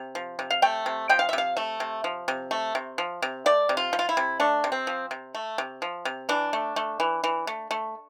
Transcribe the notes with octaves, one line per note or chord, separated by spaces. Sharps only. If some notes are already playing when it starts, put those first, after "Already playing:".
Already playing: C3
F3
C3
F5
A3 G5
C3
F3 G5
F5
E5
C3 F5
A3 E5
C3
F3
C3
A3
C3
F3
C3
A3 D5
C3
F4
F3
F4
E4
C3
A3 D4
C3
C4
F3
C3
A3
C3
F3
C3
E3 D4
A3
A3
E3
E3
A3
A3